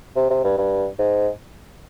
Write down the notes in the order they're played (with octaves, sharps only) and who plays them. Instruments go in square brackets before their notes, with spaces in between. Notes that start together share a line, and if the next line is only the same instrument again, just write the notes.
[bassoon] C3
C3
G2
G2
G#2